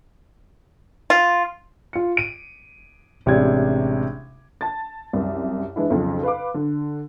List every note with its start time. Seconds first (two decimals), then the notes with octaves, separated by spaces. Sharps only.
1.10 F4
1.93 F4 C#7
2.17 D7 D#7
3.26 A1 C3 G#3 D4 G#6
4.61 A5 A6
5.13 C2 F#2
5.76 E3 G#3 D4 E4
5.90 B1 F2 C#3
6.23 B4 F5 D6
6.54 D3